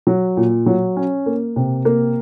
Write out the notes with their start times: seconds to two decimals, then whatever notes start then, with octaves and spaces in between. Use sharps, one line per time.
0.07 F#3
0.37 A#2
0.66 F#3
0.97 C#4
1.26 A#3
1.56 C3
1.85 A#3